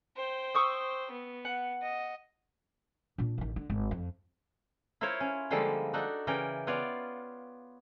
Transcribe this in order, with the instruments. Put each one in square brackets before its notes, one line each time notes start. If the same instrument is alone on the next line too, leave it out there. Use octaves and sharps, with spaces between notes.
[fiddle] C5 G5
[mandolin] C#6 D#6 E6
[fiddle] B3
[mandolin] F#5
[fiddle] D#5
[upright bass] A#2 D4
A1 D#3
D3
G#1
F2
[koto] E4 F4 A#4 C5 C#5 F5
C#4
D3 F3 G3 G#3 A#3 A4
D4 D#4 F#4 A4
C#3 E3 A#4 D5 G5
B3 F4 C#5 D5 F5